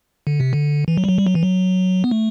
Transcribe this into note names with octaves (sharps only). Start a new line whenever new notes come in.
D3
C3
D3
E3
F#3
G3
F#3
G3
F#3
E3
F#3
B3
A3